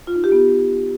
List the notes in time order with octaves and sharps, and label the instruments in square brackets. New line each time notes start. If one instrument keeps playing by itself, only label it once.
[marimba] F4
D#4
G4
B3